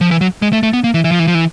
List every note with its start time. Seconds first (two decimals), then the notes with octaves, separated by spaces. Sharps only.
0.01 F3
0.11 E3
0.21 F#3
0.42 G#3
0.53 A3
0.63 A3
0.73 B3
0.84 A#3
0.94 E3
1.04 E3
1.11 F3
1.19 E3
1.27 F3
1.35 E3